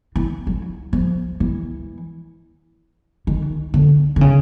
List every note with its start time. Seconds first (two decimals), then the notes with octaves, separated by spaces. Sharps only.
0.16 E3
0.47 F#3
0.93 F3
1.40 E3
3.27 D#3
3.74 D3
4.16 D3
4.21 C#3